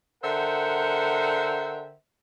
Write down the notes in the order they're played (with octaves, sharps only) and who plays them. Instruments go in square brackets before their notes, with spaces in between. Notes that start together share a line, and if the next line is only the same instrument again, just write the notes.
[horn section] D3 A#4 C5 E5 F#5 G5